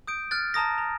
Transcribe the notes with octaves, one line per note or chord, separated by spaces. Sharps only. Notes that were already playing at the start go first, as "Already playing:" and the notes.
D#6 G6 D7
F6 F#6 A6
A5 A#5 D#6 A#6
A#5